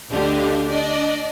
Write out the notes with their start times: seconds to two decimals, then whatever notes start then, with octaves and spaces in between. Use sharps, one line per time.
0.11 D2 D3 D4 G4 D#5 F5
0.69 D4 D5 D#5